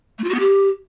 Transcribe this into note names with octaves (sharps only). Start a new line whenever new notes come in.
A3
F4
F#4
B3
G4